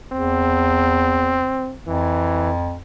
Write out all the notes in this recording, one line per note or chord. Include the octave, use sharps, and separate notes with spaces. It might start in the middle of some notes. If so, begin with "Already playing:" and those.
E2 C4
F2 E3